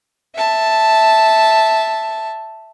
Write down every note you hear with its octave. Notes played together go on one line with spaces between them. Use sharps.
E5 A5